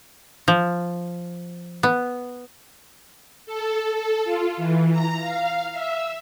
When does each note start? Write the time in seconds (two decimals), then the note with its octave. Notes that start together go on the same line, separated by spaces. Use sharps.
0.48 F3
1.83 B3
3.46 A4
3.93 A4
4.25 F4
4.57 E3
4.92 A#5
5.21 F5
5.72 E5